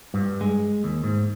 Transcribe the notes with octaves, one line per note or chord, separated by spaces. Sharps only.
G2
G#3
D#2
G#2